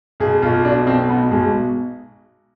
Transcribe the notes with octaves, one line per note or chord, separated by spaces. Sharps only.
B1 G#4
B1 F4
B2 D4
B1 C4
B2 B3
B1 G#3